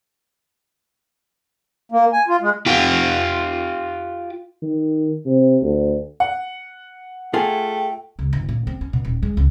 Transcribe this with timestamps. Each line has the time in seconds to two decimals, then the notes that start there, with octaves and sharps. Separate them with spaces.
1.92 A#3
2.13 G#5
2.28 F4
2.41 G#3
2.66 F4 G4
4.62 D#3
5.26 C3
5.62 D2
6.20 F#5
7.34 A3 F4 G#4 A4 G5
8.19 C#2
8.33 G1
8.49 A#2
8.67 C4
8.81 C#4
8.93 B2
9.05 D#1
9.23 G#3
9.37 C#2